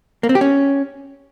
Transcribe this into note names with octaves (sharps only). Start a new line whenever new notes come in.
A#3
C4
G4
C#4